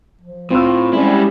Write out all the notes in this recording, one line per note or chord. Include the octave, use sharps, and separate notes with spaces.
F3
A2 C4 F4 E6
G3 G#3 C#4 E4